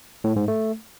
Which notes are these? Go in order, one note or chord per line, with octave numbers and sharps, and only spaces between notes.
A2
G#2
A3